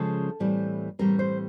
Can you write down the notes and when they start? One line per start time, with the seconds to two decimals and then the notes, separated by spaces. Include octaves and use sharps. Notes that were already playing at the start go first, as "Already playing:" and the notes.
Already playing: C#3 F3 G#3 A4
0.40 A2 E3 G3 C4
0.99 A2 E3 G3 C4 A#4
1.19 C5